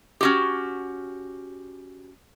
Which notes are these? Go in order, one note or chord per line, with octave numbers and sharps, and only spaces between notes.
C#4 F#4 G4